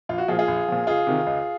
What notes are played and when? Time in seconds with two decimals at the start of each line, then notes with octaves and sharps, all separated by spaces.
0.09 A#1 F4
0.18 F#4
0.28 A#2 F3 F4 G#4
0.39 F4 G#4
0.48 A#1
0.68 A#2 F3
0.87 C#2 F4 G#4
1.07 C3 D#3
1.27 C#2